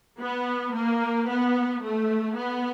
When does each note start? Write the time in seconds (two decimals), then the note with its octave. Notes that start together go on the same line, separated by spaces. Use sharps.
0.19 B3
0.74 A#3
1.28 B3
1.83 A3
2.36 B3